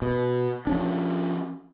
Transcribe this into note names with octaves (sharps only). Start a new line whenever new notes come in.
B2
F3 C#4 D4